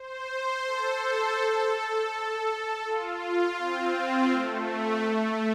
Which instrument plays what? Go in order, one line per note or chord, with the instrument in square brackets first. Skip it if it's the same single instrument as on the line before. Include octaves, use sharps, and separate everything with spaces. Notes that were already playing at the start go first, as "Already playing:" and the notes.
Already playing: [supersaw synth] C5
A4
F4
C4
A3
A3